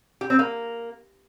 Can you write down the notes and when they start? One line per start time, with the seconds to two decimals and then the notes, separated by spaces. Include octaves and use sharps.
0.21 G4
0.30 C4
0.39 A#3